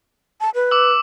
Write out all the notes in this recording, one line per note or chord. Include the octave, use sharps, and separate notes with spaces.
A5
B4
D6 E6